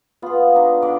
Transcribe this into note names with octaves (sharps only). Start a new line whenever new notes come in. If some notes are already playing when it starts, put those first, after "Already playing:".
B3 F4 G#4
D4 D#4
D3 D4 D5